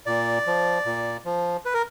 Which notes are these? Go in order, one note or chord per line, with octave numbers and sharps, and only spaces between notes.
A#2 D5
F3
A#2
F3
B4
A#4